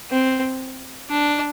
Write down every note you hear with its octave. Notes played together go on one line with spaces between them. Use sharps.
C4
D4